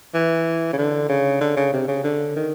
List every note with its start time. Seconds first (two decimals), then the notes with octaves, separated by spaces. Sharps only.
0.14 E3
0.73 C#3
0.78 D3
1.09 C#3
1.41 D3
1.57 C#3
1.73 C3
1.88 C#3
2.04 D3
2.36 D#3